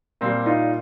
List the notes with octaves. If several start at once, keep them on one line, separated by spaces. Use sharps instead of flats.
A#2 G3 A#3 C4
D#4 F4